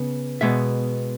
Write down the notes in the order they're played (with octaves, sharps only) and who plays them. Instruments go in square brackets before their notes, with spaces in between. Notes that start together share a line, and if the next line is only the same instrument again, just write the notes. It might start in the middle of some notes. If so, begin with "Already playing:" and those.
Already playing: [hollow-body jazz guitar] C#3 B3
B2 G#3 B3 E5